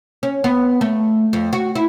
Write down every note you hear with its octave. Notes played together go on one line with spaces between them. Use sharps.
C#4
B3
A3
F2
F#4
E4